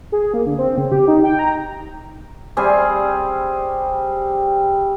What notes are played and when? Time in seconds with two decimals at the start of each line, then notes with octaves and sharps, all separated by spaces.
0.12 G#4
0.34 A#3
0.46 D3
0.58 C4
0.78 C#3
0.92 G4
1.08 D#4
1.24 G5
1.39 A#5
2.57 G3 C4 G#4 G#5